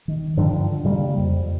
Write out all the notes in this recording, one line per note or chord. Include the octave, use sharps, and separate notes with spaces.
D#3
G2 D3 D#3 F3
C#3 G3 G#3 A#3
F2